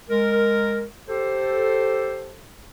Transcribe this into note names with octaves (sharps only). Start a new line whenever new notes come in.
G#3 A#4
G4 A4 C5